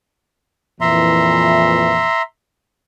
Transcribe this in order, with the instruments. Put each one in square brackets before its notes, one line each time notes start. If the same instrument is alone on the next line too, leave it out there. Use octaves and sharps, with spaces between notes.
[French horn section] F2 A#2 E3 [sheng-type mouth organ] E5 A#5 C6